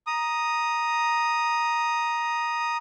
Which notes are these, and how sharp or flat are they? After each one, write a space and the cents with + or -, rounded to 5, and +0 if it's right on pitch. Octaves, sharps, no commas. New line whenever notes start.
A#5 +10 D#6 +0